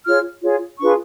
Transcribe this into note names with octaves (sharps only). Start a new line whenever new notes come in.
F4 G#4 C#5 F6
F4 G#4 C#5
D4 F4 G#4 B4 C#6